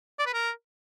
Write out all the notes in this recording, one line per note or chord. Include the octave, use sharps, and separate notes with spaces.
D5
B4
A#4